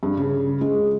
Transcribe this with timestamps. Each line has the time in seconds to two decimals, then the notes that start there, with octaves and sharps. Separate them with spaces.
0.03 G2
0.17 C#3
0.61 G#3